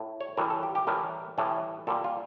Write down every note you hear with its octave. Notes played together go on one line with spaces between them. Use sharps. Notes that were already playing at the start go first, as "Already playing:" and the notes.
Already playing: A2
C#5
A2 E3 G3 A#4
A4
G4
G4
A2 E3 G3 A#4
A2 E3 G3
A#2 G3 A4
F4